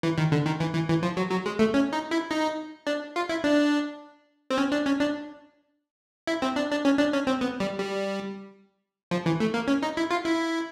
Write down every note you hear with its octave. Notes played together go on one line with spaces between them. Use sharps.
E3
D#3
D3
D#3
E3
E3
E3
F3
F#3
F#3
G#3
A3
C#4
D#4
E4
D#4
D4
F4
E4
D4
C4
C#4
D4
C#4
D4
E4
C4
D4
D4
C#4
D4
C#4
C4
B3
G3
G3
F3
E3
A3
A#3
C#4
D#4
E4
F4
E4